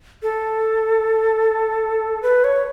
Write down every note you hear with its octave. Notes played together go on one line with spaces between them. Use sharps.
A4
B4
C#5